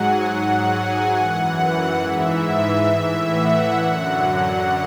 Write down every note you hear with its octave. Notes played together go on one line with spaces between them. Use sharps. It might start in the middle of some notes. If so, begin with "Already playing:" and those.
Already playing: G#2 F#3 F#5 G#5
G#2 F#3 F#5
G#5
F#2 E3 F#5
F#5
G#2 E3 E5
A2 E3 E5
F#5
F#2 D3 F#3 F#5
F#5